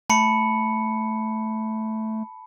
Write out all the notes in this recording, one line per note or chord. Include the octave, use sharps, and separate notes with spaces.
A3 A5 B5 C#7